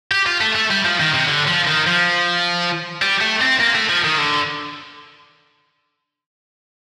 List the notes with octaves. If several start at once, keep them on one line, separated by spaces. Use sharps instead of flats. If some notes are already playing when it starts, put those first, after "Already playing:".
G4
F4
A3
A3
G3
F3
D#3
C3
D3
F3
D#3
F3
G3
A3
C4
A#3
A3
F3
D#3
D3